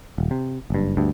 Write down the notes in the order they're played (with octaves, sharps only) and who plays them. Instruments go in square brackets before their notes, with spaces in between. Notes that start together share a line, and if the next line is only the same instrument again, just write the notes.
[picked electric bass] D#1
C3
F#1 G2
D2 G2